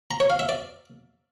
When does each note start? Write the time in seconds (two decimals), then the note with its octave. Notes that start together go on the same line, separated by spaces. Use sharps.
0.11 A#5
0.20 C#5
0.30 F5
0.39 E5
0.49 D5